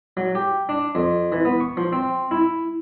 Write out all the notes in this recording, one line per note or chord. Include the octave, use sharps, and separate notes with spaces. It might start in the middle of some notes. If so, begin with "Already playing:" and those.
F#3
G4
D4
F2
E3
B3
C#6
F3
C4
E4